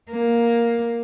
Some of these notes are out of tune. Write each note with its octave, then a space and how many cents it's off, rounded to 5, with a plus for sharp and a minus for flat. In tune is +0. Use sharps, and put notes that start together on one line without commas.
A#3 +5